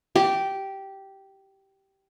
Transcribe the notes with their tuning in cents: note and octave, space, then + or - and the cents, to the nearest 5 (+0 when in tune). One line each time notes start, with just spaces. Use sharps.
G4 -10